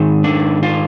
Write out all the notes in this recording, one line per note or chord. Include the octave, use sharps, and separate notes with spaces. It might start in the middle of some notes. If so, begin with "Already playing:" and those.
Already playing: G#2 D#3
D4
F4